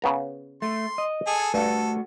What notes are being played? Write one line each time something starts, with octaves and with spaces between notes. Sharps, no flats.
C#3 B3 A#5
A3 C6
D#5
G#4 A4 G#5
G2 A3 F#4 A4